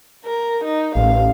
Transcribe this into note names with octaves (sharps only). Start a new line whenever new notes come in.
A#4
D#4
A1 F5